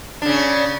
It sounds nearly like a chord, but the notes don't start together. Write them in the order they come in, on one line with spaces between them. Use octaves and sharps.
D4 C#3 C#4